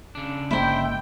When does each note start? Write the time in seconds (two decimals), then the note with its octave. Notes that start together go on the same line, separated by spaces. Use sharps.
0.15 C#3 D4
0.51 G1 G#3 A#3 E4 C5 G5